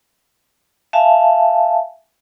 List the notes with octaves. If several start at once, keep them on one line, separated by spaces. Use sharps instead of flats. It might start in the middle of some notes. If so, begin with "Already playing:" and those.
E5 F5 G#5 A5